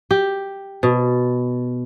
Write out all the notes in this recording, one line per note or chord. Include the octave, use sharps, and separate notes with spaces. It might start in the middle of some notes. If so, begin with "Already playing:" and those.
G4
B2